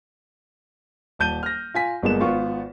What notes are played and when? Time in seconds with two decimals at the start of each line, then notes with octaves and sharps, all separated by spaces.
1.19 D#1 A5 G6 D#7 G7
1.43 F6 A#6
1.74 F4 G#5 B6
2.02 G1 G#3 A#3 B3 E7
2.21 G#1 B3 F4 C#6